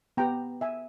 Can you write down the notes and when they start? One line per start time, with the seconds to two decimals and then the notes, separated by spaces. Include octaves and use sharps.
0.17 B3 G4 G5 A#5
0.61 E5 G#5